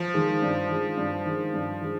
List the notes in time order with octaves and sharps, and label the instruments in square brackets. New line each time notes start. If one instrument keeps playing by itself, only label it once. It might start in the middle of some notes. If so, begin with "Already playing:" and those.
Already playing: [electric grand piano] F3
[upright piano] D#3 G#3
G2
D#3 G#3
G2
D#3 G#3
G2
D#3 G#3